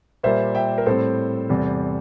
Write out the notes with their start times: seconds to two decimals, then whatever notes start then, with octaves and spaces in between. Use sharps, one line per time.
0.23 A#2 G3 A#3 C5 E5
0.55 E5 G5
0.78 A#4
0.86 A2 G3 C4 A4 C5
1.49 E2 C3 G3